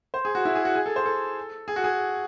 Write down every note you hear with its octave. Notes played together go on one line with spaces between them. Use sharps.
C5
G#4
F#4
E4
G#4
F#4
G#4
A4
C5
A4
G#4
F#4
G#4